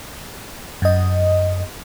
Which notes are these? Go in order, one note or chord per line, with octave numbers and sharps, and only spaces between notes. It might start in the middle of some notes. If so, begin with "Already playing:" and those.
F#2 D#5